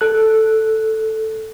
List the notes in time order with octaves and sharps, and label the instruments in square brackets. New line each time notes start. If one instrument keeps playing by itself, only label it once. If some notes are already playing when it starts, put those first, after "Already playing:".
[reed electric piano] A4 F#6